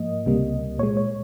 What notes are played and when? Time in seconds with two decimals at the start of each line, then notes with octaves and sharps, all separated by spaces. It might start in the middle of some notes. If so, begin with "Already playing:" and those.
Already playing: G#2 F3 A#3 D#5
0.26 C#2 C3 G3 A#3
0.79 A#2 G#3 C#5
0.97 C#5